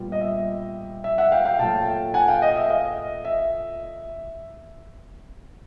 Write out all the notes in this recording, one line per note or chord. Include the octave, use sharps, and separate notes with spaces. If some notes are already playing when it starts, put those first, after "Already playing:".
Already playing: A#2 G3 B3
D#5
E5
E5
E5 F#5
F5 G5
F5 G5
A#2 F#3 A3 G5 A5
F#5 G#5
F5 G5
D#5
E5
D#5 F5
E5